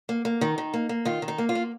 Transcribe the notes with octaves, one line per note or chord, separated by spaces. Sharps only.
A#3
A#3
D#3 D#4
D#3
A#3
A#3
D#3 F4
D#3
D#4
A#3
F4
A#3